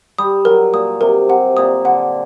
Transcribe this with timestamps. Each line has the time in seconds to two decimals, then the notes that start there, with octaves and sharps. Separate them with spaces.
0.18 G3 D#6
0.45 F#3 A#4
0.73 A#2 D#6
1.01 C3 A#4
1.29 C3 F#5
1.57 A#2 D#6
1.85 D3 F#5